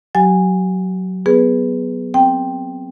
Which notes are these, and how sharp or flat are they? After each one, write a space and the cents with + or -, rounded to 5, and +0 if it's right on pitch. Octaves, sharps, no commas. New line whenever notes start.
F#3 +0 G4 -35 G#5 -15
B3 +0 G#4 +0 B4 +0
C4 +0 G5 +0